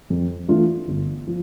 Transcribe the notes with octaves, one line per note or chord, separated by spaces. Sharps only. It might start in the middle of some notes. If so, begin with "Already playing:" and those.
F2
E3 A3 D4 F4
G1
F3